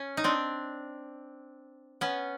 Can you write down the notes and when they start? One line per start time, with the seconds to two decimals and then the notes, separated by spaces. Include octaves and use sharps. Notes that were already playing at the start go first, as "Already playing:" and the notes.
Already playing: C#4
0.17 D#4
0.24 C4 D4
2.01 B3 C#4